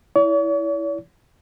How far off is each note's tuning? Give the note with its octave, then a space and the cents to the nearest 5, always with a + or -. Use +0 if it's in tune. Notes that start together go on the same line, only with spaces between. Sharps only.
E4 -5 C#5 +45